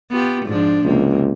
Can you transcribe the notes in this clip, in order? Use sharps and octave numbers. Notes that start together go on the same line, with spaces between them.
B3 F4 G4
G#2 F3 D4
C#2 C3 A#3